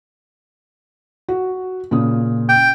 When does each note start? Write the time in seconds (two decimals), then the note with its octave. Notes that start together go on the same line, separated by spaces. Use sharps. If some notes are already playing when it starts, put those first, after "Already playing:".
1.28 F#4
1.91 A#2 C#3 D#6
2.49 G5